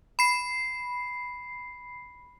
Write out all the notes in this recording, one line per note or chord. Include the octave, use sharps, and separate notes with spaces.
B5 C7